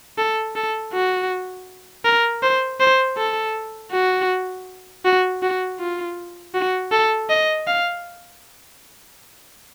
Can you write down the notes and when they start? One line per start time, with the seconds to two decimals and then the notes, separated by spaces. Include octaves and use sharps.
0.18 A4
0.56 A4
0.93 F#4
2.05 A#4
2.43 C5
2.80 C5
3.17 A4
3.92 F#4
5.05 F#4
5.42 F#4
5.80 F4
6.54 F#4
6.92 A4
7.30 D#5
7.67 F5